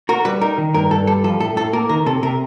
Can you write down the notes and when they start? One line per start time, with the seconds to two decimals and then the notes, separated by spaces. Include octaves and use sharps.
0.09 F#4 A#4
0.25 G3 B4
0.41 D#4 A#4
0.58 D#3
0.74 G2 A#4
0.91 G2 A4
1.07 G3 A4
1.24 F3 A4
1.40 A2 A4
1.57 A2 A4
1.73 A#3 A#4
1.89 D#3 A#4
2.06 C3 A4
2.23 C3 A#4